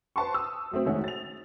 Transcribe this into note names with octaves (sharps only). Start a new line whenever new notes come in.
B4 C5 A5 C6 C#6
D#6 E6
F#3 A3 C4
D#3 G#3 A3 C#4 F#4
A6 F7